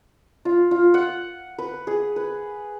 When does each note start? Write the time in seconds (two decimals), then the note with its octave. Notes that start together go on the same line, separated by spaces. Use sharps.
0.45 F4
0.71 F4
0.94 F#5
1.58 B4
1.87 G#4
2.16 B4